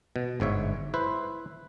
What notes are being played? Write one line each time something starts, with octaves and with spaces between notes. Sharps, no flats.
B2
G1 G#2 C#5 E5
E4 B4 C5